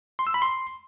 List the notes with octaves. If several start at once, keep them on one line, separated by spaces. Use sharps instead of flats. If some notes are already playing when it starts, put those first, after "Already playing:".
C6
E6
B5
C6